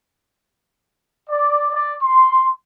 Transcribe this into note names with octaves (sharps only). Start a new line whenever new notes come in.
D5
D5
C6